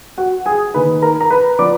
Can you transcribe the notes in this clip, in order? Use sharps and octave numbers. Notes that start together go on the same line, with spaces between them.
F#4 F#5
G#4 G#5
D#3 A#3 D#4 B4 B5
A#4 A#5
A#5
B4 B5
F3 B3 D5 D6